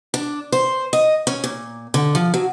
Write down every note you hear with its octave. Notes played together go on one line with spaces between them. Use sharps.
D4
C5
D#5
C#4
A#2
D3
F3
F#3